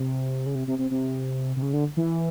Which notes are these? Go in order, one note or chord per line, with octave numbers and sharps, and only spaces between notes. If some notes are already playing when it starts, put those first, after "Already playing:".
Already playing: C3
C#3
C3
C3
C3
C3
C3
C#3
D3
E3